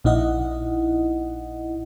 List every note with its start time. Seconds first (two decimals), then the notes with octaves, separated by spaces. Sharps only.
0.04 A#1 A#2 D#4 E4 D#5 F#5